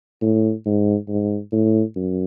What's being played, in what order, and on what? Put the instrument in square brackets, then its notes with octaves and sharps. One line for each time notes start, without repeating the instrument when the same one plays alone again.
[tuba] A2
G#2
G#2
A2
F#2